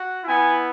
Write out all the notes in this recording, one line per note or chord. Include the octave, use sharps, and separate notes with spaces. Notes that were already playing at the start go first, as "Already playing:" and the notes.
Already playing: F#4
B3 E4 G#5